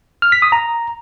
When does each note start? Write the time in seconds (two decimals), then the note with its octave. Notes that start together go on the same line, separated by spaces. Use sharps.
0.22 F6
0.32 B6
0.42 D#6
0.52 A#5